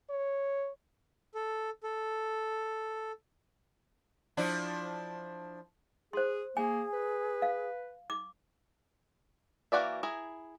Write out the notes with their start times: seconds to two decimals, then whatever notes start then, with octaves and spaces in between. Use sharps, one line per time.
0.10 C#5
1.35 A4
1.83 A4
4.37 F3 D4 E4
6.13 G#4 C5 C6
6.57 A#3 G#4 G#5
6.93 B4
7.42 F5
8.10 D6
9.72 E3 A#3 F#4 D5 E5
10.03 E4 G#4 A#5